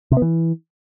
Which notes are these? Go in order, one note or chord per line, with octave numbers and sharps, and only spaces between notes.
C3
B3
E3